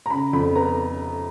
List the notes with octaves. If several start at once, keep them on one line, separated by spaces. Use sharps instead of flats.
A#5
C#3 B5
F2 B5
B3 A#5